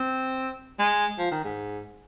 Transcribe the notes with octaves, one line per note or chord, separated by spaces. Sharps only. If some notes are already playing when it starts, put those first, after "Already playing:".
Already playing: C4
G#3
F3
D#3
G#2